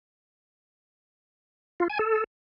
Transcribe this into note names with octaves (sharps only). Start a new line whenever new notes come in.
F4
G#5
A4